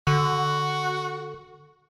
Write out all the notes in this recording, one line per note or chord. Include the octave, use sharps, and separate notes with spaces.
D3 F#4